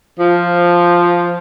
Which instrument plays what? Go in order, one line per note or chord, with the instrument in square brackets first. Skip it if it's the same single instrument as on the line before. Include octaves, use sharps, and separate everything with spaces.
[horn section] F3